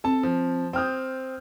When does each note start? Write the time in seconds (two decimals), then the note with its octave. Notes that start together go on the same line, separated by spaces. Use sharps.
0.04 C4 A4 A5
0.23 F3
0.73 C4 G5 D#6 F6 G6